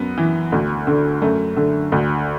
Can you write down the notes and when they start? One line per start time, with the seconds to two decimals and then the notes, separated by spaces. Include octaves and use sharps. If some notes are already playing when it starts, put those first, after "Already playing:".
Already playing: F#2 B3
0.18 E3
0.52 D2
0.87 D3
1.22 F#2 A3
1.56 D3
1.92 D2